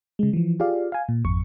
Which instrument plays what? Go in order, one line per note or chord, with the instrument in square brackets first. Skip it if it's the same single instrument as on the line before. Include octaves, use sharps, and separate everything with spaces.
[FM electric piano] C#3 G#3
E3 F3
F4 G4 G#4 D5 F5
F5 G#5
A#2
G#1 F2 C#6